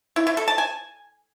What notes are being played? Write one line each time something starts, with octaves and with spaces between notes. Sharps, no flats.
E4
E4
A4
A5
G#5